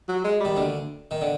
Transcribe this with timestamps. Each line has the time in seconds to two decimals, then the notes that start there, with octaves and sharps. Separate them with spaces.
0.08 F#3
0.24 G#3
0.40 D#3 G3
0.56 D2 D3
1.11 D#3
1.21 D3